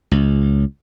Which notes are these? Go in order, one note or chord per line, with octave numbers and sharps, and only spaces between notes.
C#2